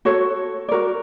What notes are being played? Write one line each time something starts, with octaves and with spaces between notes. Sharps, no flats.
F#4 A4 C#5
F#4 A#4 D5